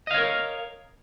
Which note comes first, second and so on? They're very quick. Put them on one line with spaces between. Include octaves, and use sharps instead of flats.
D#5 F5 C#5 A#4